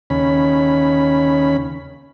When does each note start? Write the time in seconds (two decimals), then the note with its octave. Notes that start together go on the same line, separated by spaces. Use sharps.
0.10 D#2 C#3 C#4 B5